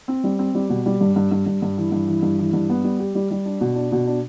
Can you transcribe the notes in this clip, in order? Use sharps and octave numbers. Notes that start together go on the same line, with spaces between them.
C4
G3
C4
G3
B2
G3
G2
G2
G2
G2
G2
E3
G2
E3
G2
E3
G2
B3
G3
G4
G3
G3
D4
B2
D4
B2
D4